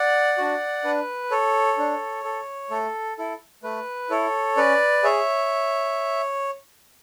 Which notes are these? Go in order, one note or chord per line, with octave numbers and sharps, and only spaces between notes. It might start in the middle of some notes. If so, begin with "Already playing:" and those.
Already playing: D5 F#5
D4 F#4
D4 B4
A4 C#5
D4
A4
A3 A4
E4 A4
A3 B4
E4 A4 C#5
C#4 B4 D5
G#4 C#5 E5